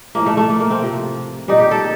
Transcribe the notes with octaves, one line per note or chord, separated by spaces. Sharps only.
A2 F3 A#3
A3
A3
A#3
A#3
C4
C3 F3
A#2 G3 D#4
G4
A4